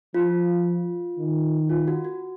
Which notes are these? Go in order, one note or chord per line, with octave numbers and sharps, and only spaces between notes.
F3 F4
D#3
F4
F#4
F#4